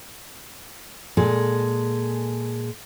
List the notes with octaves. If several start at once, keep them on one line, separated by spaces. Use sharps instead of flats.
A#2 G#3 G#4 A4